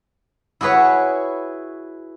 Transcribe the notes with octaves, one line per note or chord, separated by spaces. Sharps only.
E4 F#4 G#4 B4 C#5